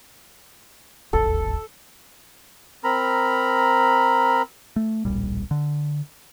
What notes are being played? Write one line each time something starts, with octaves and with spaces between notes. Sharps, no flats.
D1 G#1 D#2 A4
C4 A#4 A#5 B5
A3
D1 A#1 G3
D3